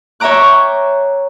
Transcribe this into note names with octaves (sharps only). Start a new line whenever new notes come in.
C#5 E5 G5 A#5 D6 F#6